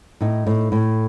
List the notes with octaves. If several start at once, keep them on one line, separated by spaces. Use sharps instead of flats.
A2 D#4
A2
A2